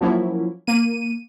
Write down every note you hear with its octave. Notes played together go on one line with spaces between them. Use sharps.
F3 F#3 A#3 C#4 E4
A#3 D#7